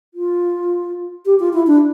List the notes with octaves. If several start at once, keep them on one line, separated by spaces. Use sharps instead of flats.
F4
G4
F4
E4
D4